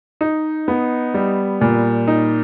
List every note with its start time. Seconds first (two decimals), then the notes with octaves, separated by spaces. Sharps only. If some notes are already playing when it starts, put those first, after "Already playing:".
0.21 D#4
0.68 B3
1.14 G3
1.61 A#2
2.08 D#4